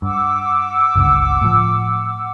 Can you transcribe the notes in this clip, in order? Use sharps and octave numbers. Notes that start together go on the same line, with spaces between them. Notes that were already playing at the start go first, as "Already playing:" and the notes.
G2 F#5 D6 E6
G1 C#2 G2
A2 F3